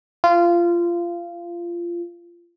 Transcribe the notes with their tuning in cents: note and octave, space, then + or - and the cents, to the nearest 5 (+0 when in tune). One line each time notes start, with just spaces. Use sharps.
F4 -20